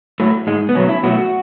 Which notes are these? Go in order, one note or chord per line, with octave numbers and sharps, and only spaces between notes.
A2 F#3 A3
G#2 G#3
B3
B2 F#3 A3 C#4
E4
B2 F#3 A3 F#4